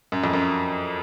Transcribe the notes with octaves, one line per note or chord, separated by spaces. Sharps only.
F#2
F2
F#2